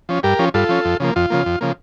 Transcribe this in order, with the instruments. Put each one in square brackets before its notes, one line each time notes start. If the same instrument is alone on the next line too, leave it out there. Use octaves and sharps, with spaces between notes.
[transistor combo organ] F3 C#4
G2 G4 A#4
F3 C#4
G2 F4 A4
F3 C#4
F2
C#3 F3 A#3
F2 F4
C#3 F3 A#3
F2
C#3 F3 A#3